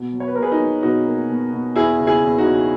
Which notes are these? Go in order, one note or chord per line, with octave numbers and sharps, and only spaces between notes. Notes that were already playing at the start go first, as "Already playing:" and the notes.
Already playing: B2
F#3
C#5
B4
B2 A#4
G#4 B4
D#4
F#3
B2 D#4 F#4
A#3
B2
B2
E2 E4 G#4
C#3
E4 G#4
E2
D#4 F#4
C#3